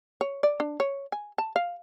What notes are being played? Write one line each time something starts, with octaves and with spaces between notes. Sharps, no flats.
C#5
D5
D4
C#5
G#5
A5
F5